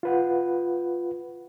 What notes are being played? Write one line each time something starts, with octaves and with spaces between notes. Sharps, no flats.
F4 B4 F#5